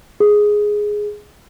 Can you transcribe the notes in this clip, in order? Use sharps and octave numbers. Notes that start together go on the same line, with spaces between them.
G#4